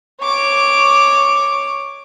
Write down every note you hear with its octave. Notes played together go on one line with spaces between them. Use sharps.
C#5 D6